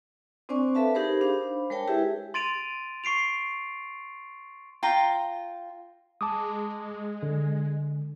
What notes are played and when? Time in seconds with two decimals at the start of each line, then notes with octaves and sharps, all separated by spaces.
0.49 C4 D4 C5 D5 G#5 C#6
0.75 A4 B4 E5 F5 A5
0.94 D#4 G4 G#4 A#4 C5 B5
1.21 D4 C5 F5 B5
1.70 G#3 A#4 C#5 G5 A5
1.88 E4 G4 G#4 B4 E5 G#5
2.34 C6 A6 D7 D#7 F7
3.04 C#6 C7 D7 F7
4.83 F4 G5 A#5
6.21 G#3 A5 D6 D#6
7.23 D3